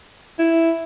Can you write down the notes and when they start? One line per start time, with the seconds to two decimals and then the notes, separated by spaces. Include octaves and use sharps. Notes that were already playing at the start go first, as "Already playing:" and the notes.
0.39 E4